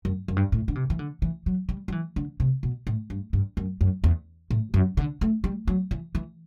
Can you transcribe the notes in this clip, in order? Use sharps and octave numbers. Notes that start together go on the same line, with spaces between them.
F#2
F#2
G2
A2
D3
C3
E3
D3
E3
F#3
G3
F#3
E3
D3
C3
B2
A2
G2
G2
F#2
F#2
E2
A2
F#2
D3
A3
G3
F#3
E3
E3